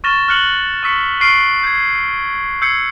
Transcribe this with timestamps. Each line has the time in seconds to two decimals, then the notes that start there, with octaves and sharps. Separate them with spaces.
0.04 C#6 F6 A6 A#6 E7 G7
0.28 F6 F#6 C#7 F#7 G7
0.83 C#6 E6 B6 C#7
1.20 C#6 F6 C7 D7 D#7 G7
1.63 G6 G#6
2.62 E6 G6 G#6 C7 C#7